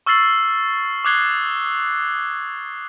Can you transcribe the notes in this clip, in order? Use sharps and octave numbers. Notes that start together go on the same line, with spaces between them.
C#6 E6 F6 A6 C7 F#7
D6 D#6 F#6 G#6 C7 G7